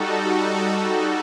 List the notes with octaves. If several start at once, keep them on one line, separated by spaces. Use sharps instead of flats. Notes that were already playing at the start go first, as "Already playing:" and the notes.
Already playing: G3 D#4 F#4 A4